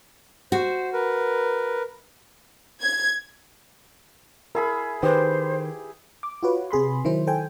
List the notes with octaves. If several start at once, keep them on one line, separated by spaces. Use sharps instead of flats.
F#4 C5
A#4 B4
G#6
E4 G#4 A#4 B5
D#3 G4 G#4 B4 C5
D6
F4 F#4 B4 C#5
C3 G#4 B5 C6
D#3 F#3 E4 C5
A4 C5 G5 G#5